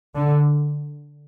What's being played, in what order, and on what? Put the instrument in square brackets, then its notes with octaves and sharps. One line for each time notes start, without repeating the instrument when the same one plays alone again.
[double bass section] D3